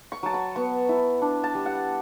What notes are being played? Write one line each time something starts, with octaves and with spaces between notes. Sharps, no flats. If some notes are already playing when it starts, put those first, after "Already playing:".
C#6
F#3 A5
B5
B3 C#6
E4
D4
A5
G3
F#5